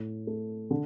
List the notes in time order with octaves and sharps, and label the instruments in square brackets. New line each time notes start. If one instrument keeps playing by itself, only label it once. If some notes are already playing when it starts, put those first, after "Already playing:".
Already playing: [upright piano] A2
A3
D3